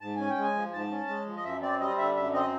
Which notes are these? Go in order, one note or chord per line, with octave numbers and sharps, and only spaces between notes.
G#2 A5
C#4 G#5
G5
G#3
G#5
F3
G#2 A5
C#4
G#3
F3
D#5
F#2 E5
C4 D5
G3 D#5
D3 E5
F#2 E5
C4 D#5